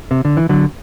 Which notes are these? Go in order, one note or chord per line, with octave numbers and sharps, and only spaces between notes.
C3
D3
E3
D3 F#3